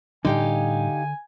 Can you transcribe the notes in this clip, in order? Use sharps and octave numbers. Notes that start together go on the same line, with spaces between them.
A2 D3 G3 D4 D#4 G4 F5 G#5